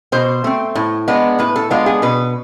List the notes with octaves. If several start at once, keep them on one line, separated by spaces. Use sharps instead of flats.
B2 C5
A3 C4
A2
G#3 B3 D4
A2 B4
A4
G#3 B3 D4 F4
G#4
B2 B4